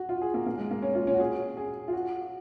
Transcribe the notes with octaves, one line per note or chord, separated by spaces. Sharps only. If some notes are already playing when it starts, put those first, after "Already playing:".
Already playing: F#4
F4
G#4
A#3
A#3
G#3
A#3
C#4
F4
C#4
F#4
G#4
G#4
F4
F#4